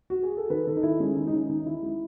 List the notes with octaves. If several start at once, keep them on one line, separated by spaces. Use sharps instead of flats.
F#4
G#4
A4
D#3 B4
D#3 A4
D#4
D#3 E4
G#3 C#4
D#3 D#4
D#4
D#3 C#4
D#3 D#4
D#3 E4
G#3 E4